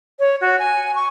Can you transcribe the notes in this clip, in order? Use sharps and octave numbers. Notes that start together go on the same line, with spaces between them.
C#5
F#4
G#5
C#6